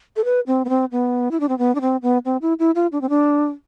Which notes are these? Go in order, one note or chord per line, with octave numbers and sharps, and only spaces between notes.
A4
B4
C4
B3
C4
B3
E4
D4
C4
B3
D4
C4
B3
C4
E4
E4
F4
D4
C4
D4